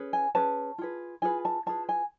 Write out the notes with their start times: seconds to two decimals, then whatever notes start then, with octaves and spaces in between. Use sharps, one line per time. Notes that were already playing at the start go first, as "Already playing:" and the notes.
Already playing: C#4 G#4 B4
0.13 G#5
0.35 C#4 G#4 B4 A5
0.78 F4 G#4 B4
1.22 F4 G#4 B4 G#5
1.45 A5
1.66 F4 G#4 B4 A5
1.89 G#5